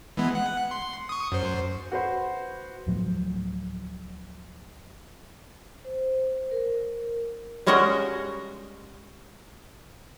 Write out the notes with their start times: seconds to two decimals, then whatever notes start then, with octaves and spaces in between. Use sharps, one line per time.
0.17 E3 G#3 B3
0.35 F#5
0.71 C6
1.09 C#6 D#6
1.32 F#2 C5
1.92 F#4 B4 C5
2.87 D2 A2 F3 F#3
5.85 C5
6.51 A#4
7.66 G3 G#3 C#4 F#4 A#4 D#5